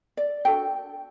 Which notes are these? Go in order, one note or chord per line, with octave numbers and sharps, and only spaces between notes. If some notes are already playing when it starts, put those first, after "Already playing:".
D5
D4 F#4 A4 G5